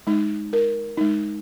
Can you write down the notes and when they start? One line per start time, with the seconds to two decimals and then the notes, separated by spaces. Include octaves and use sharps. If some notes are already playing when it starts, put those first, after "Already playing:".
0.07 G#3 D#4
0.53 A#4
0.97 G#3 D#4